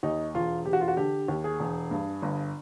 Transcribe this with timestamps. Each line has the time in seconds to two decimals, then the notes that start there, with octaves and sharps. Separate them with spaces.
0.03 D#2 D#4
0.34 E1 F4
0.65 E1 G4
0.73 F#4
0.81 F4
0.88 F#4
0.97 D3 G4
1.28 D#2
1.44 G#4
1.60 E1
1.91 G2
2.22 G1